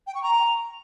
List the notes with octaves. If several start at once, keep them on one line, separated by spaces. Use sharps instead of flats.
G5
C#6
A#5